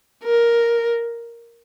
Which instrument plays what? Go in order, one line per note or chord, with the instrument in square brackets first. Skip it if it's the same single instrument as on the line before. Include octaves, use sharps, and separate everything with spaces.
[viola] A#4